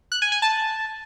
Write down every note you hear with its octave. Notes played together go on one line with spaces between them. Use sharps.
F#6
G#5
G#5
A5